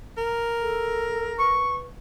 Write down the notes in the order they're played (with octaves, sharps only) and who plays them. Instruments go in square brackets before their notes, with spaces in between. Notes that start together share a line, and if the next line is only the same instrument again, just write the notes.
[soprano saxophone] A#4
[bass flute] A4
[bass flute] B4 [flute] C#6